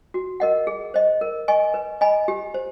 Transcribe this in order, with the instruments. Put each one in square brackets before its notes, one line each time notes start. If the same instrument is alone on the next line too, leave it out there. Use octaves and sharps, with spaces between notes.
[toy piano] F#4
A#4 D#5 F#5
G#4
C5 D#5
A#4
D#5 G#5 C#6
B4
D#5 G#5 B5
G4
C5